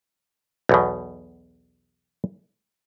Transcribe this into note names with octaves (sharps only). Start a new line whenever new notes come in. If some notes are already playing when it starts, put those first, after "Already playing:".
B1 E2 B2